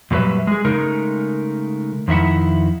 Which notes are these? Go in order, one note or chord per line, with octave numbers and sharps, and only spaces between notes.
F#2 A#2 F#3 G3 B4 E5
G#3 G#4
C#3 G#3 A3 D#4 A#4
F2 D#3 E4 E5 F#5